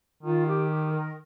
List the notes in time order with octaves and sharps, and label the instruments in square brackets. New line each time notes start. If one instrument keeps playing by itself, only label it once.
[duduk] D#3 [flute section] F4
[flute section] G4
G4
A#4